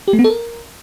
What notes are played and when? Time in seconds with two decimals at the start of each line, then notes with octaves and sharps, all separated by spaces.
0.08 G4
0.13 A3
0.19 B3
0.24 A4
0.30 A#4